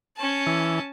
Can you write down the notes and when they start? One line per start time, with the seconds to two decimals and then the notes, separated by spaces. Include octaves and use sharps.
0.17 C#4 A5
0.47 E3